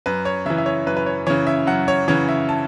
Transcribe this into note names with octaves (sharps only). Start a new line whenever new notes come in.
F#2 B4
C#5
C#3 E3 E5
E5
C#5
F#2 B4
B4
C#5
C#3 E3 C#5
E5
F#2 F#5
C#5
C#3 E3 C#5
E5
A5